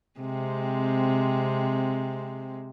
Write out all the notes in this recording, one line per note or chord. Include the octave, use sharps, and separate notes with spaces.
C3 G#3 C4